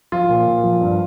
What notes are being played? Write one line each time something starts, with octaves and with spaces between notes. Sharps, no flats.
F3 F4
A#2
A#2
F3
G2